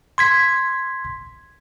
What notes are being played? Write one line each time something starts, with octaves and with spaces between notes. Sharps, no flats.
C6 G#6 B6